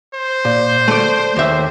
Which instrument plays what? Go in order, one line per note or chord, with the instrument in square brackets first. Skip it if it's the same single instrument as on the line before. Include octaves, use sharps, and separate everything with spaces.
[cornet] C5
[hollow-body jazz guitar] A#2
A3 D5
D#2 E5